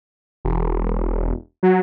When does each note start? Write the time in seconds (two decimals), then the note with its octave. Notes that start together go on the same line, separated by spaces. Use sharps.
0.45 E1
1.63 F#3